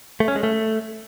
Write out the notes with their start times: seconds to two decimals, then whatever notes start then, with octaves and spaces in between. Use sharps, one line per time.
0.20 A3
0.28 C#4
0.36 G#3
0.43 A3